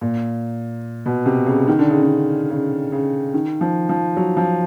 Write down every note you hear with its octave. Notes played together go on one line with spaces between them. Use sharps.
A#2
B2
C3
C#3
D#3
D3
C#3
D3
C#3
C#3
D#3
F3
F3
F#3
F3